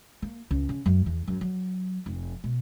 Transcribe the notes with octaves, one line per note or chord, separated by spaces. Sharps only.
A#3
C#2
C#3
F#2
E2
F#2
F#3
F1
B2